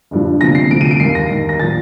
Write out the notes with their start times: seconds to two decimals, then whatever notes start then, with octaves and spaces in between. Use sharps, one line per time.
0.11 G1 G2 F3
0.41 D2 C3 F3 A#6
0.55 C7
0.70 D2 C3 F3 D7
0.81 D#7
0.91 D7
1.00 D#2 D#3 C7
1.15 A#6
1.31 D#2 D#3
1.49 A#6
1.60 A#2 F3 A6